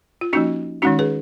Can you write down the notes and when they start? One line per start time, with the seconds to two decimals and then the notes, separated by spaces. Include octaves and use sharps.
0.21 F4
0.33 F3 A#3 C#4 D#4 F#4
0.82 D#3 G#3 C#4 D#4 F#4
0.99 G#4 B4